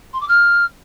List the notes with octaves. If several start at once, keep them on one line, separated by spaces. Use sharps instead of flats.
C6
D6
F6